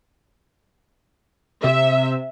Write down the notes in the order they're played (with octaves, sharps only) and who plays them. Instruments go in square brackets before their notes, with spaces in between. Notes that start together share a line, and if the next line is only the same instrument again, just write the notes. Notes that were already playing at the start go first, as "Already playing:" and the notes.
[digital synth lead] C3 [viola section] E5